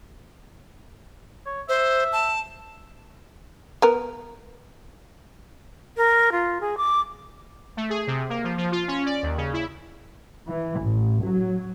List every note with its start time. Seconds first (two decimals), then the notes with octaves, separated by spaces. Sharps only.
1.46 C#5
1.69 C5 E5
2.12 A5
3.82 B3 A#4
5.97 A#4
6.32 F4
6.61 G#4
6.77 D6
7.77 A3
7.90 G#4
8.07 C3
8.30 A#3
8.44 F3
8.58 F3
8.72 F4
8.88 C#4
9.06 D5
9.23 D#2
9.37 C#3
9.53 E4
10.48 E3
10.81 A1
11.25 F#3